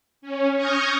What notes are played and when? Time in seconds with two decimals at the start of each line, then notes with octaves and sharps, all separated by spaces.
0.22 C#4
0.55 C#6 D#6 F6 G6 G#6 A#6